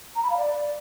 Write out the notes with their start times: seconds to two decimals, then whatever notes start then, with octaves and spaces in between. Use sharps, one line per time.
0.16 A#5
0.23 B5
0.30 F5
0.37 D5